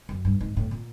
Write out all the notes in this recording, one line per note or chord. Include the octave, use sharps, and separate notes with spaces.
F#2
G2
G#2
A2
A#2